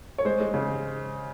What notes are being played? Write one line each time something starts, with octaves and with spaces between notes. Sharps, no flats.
C#5
G#3 C5
G#3
C#3